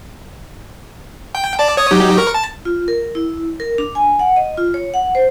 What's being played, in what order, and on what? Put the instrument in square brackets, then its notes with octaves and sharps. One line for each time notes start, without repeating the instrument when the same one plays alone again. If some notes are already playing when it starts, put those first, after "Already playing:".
[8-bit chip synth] G5
D5 A5
C#5 D#6
F#3 D#4 G4
A#4 C#6
A5
[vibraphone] F4
A#4
E4
A#4
D4
G#5
F#5
D#5
F4
C#5
F#5
C5